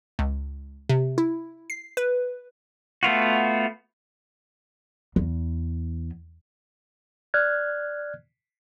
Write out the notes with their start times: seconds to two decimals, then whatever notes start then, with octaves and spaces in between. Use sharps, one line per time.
0.19 C#2
0.89 C3
1.18 E4
1.70 C7
1.97 B4
3.03 A3 B3 F4 F#4
5.16 E2
7.34 D5 F6 F#6 G#6